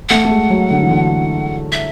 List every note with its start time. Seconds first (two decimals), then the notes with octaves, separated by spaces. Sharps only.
0.09 A3 F#5
0.25 A3
0.31 G#3
0.50 F#3
0.71 D3
0.82 E3
0.91 D3
1.72 E5